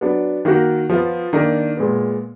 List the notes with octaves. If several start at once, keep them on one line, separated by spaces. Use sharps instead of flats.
F#3 B3 D4
D#3 A#3 D#4 F#4
F3 B3 F4
D#3 A#3 D4
A#2 G#3 B3